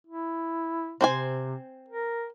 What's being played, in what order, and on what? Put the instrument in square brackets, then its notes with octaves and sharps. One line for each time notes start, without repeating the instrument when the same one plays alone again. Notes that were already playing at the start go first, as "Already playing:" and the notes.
[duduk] E4
[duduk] C3 [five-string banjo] C4 C5 G#5
[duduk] A#4